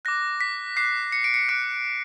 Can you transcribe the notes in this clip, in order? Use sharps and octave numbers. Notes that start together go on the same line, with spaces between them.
D6 F#6 A#6
B6
D6 F#6 C7
C#7
D7
C#7
D6 F#6 D7